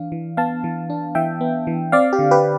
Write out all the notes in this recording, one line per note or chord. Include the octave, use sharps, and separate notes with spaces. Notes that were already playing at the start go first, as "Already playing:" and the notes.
Already playing: E3 D4 F5
E3
B3 F5 A5
E3
D4
E3 E5 G5
B3
E3
C4 D5 F5
G4
D3
G4 B4